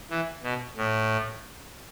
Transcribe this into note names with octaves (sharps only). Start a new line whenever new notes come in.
E3
B2
A2